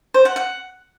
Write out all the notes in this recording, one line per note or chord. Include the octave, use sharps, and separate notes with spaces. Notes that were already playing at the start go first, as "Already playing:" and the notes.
C5
F#5
F#5